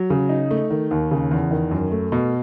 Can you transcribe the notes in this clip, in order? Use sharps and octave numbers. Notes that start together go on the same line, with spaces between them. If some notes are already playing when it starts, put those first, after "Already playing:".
Already playing: F#3
C#3
D#4
A3
D#3
D#2
C#3
E2
D#3
F#2
A3
B2